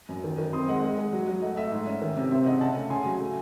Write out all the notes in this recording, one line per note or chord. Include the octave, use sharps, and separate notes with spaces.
F#2
D#3
D#3
C4 C6 D#6
G#3 D#5 F#5
G#3
G#3
F#3
F#3
A3 D#5 F#5
A3 E5
G#2
C#4
D#3
C3
C4 E5
C#3 D#5 F#5
C#4 F#5 A5
A3
C#3 G#5 C6
F#3
A3